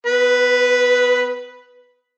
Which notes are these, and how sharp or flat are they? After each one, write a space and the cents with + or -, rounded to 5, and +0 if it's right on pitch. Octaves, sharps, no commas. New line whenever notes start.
B3 +35 B4 +0